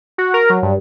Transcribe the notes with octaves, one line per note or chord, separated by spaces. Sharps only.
F#4
A#4
F#3
G2